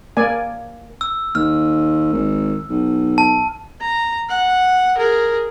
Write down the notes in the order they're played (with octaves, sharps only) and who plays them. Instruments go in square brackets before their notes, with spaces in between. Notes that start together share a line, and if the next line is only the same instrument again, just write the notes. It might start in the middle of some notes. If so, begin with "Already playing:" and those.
[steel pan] A#3 D5 G#5
[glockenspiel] E6
[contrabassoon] D#2 [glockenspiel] F6
[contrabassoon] G#1
B1
[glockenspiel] A5
[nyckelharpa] A#5
F#5
G#4 A#4